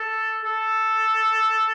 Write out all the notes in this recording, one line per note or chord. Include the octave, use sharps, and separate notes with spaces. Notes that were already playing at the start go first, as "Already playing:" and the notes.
Already playing: A4
A4